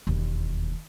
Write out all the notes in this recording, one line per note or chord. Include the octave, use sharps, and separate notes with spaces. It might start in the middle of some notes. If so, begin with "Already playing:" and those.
E1 D#2